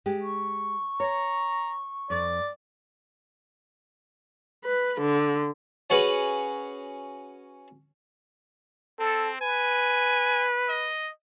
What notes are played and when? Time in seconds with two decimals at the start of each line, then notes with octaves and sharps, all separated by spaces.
0.06 G#3 G4
0.21 C#6
1.00 C#5 A#5
2.10 F2 D5
4.65 B4
5.01 D3
5.90 C#4 F#4 G#4 B4
8.99 C4 A4
9.41 B4 G#5
10.69 D#5